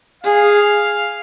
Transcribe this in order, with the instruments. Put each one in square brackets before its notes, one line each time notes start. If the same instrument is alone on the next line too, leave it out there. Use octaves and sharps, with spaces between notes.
[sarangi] G#4 [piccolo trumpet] F5